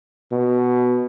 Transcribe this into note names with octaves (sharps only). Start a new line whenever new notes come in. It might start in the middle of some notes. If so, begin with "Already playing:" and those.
B2